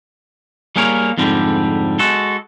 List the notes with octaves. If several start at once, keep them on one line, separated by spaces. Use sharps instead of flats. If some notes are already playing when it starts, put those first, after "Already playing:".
G3 A#3 G#4 A#4 C#5
F2 G#2 D3 G3
G#3 F#4 A4